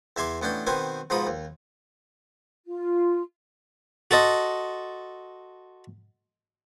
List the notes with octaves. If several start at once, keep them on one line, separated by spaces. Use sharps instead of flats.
E2 E5 G#5 C6 D6
A1 B3 C#4 D4 G5
B2 D#3 C4 B4 G#5
G#2 B2 F3 A#5 B5 D#6
D#2
F4
F#4 A4 C5 D#5